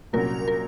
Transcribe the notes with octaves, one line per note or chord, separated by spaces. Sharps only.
C2 A#2 F#3 C#4 A#4
A#4